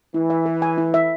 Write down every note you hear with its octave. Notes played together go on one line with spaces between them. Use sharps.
E3 E4
E5
B4
G#5
E4
E5